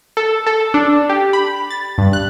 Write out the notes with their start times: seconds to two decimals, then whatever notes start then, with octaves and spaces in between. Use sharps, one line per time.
0.17 A4
0.47 A4
0.74 D4
1.09 G4
1.33 B5
1.70 A6
1.98 G2
2.13 F#6